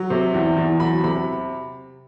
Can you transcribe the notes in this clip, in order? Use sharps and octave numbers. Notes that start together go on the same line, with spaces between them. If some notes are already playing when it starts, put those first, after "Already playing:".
Already playing: F#3
C3
E2
E2
F#3 B5
C3 B5